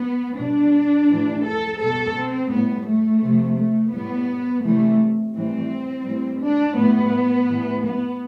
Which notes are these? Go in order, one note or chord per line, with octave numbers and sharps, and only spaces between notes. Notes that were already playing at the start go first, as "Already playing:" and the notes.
Already playing: B3
B2 G3 D4
A2 E3 G3
A4
B2 G3 A4
C4
A2 G3 B3
A3
C3 F3
A3
A2 G3 B3
C3 E3 G3 A3
A2 E3 G3 C4
A2 E3 G3
D4
A2 G3 B3
A2 E3 G3
B3